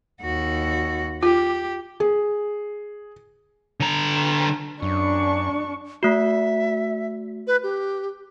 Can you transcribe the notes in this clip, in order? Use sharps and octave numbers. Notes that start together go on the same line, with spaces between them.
D#2 F#4
F4 G4
G#4
D3 A#5
F#2 D4 C#6
A3 F#4 E5
B4
G4